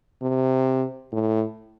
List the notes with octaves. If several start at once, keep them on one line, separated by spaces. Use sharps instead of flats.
C3
A2